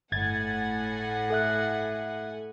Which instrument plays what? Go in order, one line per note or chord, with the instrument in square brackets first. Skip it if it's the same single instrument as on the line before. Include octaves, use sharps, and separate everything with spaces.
[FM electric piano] G1 G#6 A6 [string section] A2 F#5 G#5
[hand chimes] A4 E5 F#6